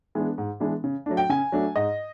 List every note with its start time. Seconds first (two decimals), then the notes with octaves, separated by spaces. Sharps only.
0.15 E3 G#3 B3 D4
0.38 G#2
0.60 E3 G#3 B3 D4
0.84 C#3
1.06 F#3 A3 D4
1.17 G5
1.29 C#3 G#5
1.52 F#3 A3 D4
1.76 G#2 D#5